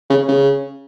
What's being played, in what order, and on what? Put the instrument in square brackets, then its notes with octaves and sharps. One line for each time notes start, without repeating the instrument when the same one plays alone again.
[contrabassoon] C#3
C#3